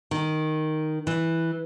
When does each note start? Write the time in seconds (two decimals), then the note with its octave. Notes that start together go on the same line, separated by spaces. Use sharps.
0.11 D#3
1.07 E3